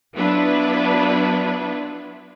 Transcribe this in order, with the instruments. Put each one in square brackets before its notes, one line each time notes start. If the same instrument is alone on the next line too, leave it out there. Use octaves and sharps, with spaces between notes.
[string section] F#3 B3 D4 E4 F4 B4